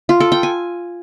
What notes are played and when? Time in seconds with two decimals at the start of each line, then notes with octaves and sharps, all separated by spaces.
0.09 F4
0.20 A4
0.32 G5
0.43 G#5